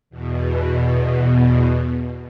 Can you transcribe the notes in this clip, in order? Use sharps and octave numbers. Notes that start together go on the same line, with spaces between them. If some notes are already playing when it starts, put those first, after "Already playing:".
E2 B2